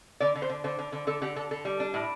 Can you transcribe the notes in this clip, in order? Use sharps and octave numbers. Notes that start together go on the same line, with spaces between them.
D3 D5
D3
C5
D3
D3 C5
D3
D3
D3 A4
D3 G4
D3 A4
D3 A4
G3
D4
A2